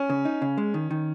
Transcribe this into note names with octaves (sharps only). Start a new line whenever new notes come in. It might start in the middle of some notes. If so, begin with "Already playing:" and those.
Already playing: C#4
C#3
D#4
C#3
G#3
D#3
D#3